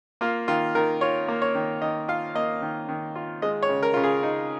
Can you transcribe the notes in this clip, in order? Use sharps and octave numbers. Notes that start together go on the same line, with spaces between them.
A#3 F4
D#3 F4
D#3 A#4
F4 C#5
A#3
C#5
D#3
D#3 D#5
F4 F5
A#3 D#5
D#3
D#3
F4
G#3 D#5
C#5
C#3
A#4
C#3 F4
G#4
D#4